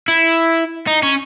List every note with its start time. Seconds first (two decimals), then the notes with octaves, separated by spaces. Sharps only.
0.08 E4
0.87 D#4
1.03 C#4